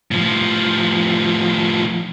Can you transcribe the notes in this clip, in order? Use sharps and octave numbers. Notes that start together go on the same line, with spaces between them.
A2 F3